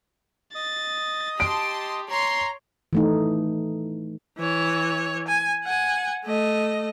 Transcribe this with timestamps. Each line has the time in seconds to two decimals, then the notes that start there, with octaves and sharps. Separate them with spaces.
0.55 D#5 D#6 A6
1.40 G4 A5 C6 D7
2.11 C#5 A#5 C6 C7
2.93 E3 A3 D#4
4.38 E3 C#5
5.28 G#5
5.64 F#5 G#5
6.25 A3 D#5